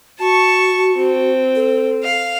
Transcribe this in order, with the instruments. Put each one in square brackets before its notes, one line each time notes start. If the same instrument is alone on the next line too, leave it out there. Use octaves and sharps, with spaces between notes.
[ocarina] F#4 [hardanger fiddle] A5 C#6
[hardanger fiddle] C4
[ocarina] A4
[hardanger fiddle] F5